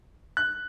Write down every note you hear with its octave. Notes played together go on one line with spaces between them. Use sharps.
F#6